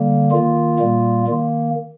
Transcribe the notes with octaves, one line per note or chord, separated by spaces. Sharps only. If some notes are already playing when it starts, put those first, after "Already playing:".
Already playing: D3 G3 A#3
D#3 A#3 F4
A#2 G3 A#3
D#3 A#3